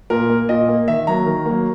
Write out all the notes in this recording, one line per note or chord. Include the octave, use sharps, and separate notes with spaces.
A#2 A#4
A#3
A#2 D#5
A#3
D#3 E5
F#3 A#3 A#5
D#3
F#3 A#3